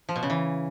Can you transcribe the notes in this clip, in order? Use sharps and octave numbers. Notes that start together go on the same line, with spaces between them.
F3
B2
C#3
E3